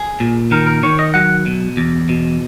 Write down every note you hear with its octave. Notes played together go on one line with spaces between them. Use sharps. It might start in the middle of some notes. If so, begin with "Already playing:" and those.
Already playing: G#4
A#2
D#3 A#4
A#4
D#3 C#5
D#5
F#3 F#5
B2
E2
B2